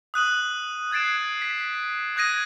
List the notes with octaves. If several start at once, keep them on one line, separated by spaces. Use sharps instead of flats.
D#6 F#6 D#7 F#7
F#6 G#6 A6 C7 D7 E7
B6
D#6 F#6 G#6 A#6 D#7